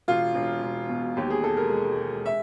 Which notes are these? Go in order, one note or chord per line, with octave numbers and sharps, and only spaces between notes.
E1 F4
E1
E1
B2
D#2 G4
G#4
G#3 A4
A#4
G#3
G#3
E5